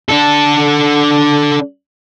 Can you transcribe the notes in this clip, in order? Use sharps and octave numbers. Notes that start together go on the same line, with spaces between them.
D3 A4